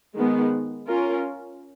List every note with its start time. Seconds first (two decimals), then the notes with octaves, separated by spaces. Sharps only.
0.15 D#3 G#3 B3
0.88 C#4 F4 A#4